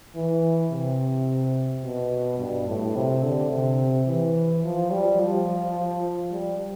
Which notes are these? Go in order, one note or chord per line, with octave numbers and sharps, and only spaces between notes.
E3
C3
B2
G2
A2
C3
D3
C3
E3
F3
G3
F3
G3